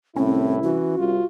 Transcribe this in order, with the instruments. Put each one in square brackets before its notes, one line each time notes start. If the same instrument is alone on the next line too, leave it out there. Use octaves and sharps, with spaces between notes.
[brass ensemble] C2 E4 [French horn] A2 [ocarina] C4 [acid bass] C#4
[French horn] E3 [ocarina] F#4
[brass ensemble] C2 [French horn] F4